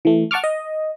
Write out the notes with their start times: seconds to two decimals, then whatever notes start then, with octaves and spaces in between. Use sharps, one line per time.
0.05 E3 A3
0.31 F#5 A5 C#6 D6 F6
0.44 D#5